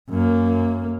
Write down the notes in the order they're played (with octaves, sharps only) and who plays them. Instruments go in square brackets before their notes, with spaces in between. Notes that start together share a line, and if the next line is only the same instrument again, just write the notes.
[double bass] F#2 A#3